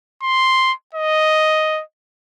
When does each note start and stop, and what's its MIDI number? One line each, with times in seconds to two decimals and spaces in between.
0.23 0.73 84
0.94 1.82 75